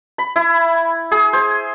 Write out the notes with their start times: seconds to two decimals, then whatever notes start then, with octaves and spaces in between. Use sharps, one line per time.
0.18 B5
0.36 E4
1.11 G#4
1.33 C5